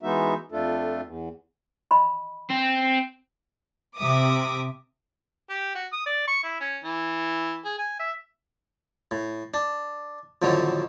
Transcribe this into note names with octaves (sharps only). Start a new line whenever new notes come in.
E3 G#3 B3 D#4 F#4 E5
F2 A3 D4 F4 A4
E2
D#5 B5 C6
C4
C3 E5 D6 D#6
G4
F#4
D#6
D5
C#6
E4
C#4
E3
G#4
G#5
E5
A2
D4
F2 A2 D3 D#3 F#3